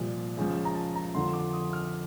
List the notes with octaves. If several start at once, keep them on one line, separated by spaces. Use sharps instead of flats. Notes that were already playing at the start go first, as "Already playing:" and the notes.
Already playing: C2 A#2 F3
C#2 C#3 F3
A#5
A5
A#5
F2 D3 F3 C6
D6
D#6
F6